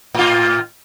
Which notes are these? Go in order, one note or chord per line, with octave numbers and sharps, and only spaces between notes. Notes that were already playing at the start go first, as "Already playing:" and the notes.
A2 F4